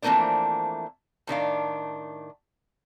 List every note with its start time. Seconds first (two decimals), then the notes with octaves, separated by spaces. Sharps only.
0.02 E3 F3 A3 A#3 C4 D4
1.27 A2 D#3 D4 F5